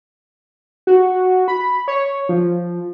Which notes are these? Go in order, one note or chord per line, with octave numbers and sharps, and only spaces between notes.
F#4
B5
C#5
F3